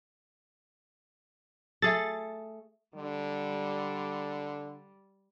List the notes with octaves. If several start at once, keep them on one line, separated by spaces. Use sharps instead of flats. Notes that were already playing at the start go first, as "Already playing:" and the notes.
A3 G#4 A4 A6
D3 G3